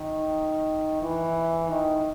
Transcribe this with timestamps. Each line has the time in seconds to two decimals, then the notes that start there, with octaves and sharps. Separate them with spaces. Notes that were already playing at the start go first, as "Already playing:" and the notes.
Already playing: D#3
1.02 E3
1.70 D#3